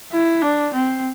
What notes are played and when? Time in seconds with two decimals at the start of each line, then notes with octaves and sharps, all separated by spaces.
0.12 E4
0.42 D4
0.74 C4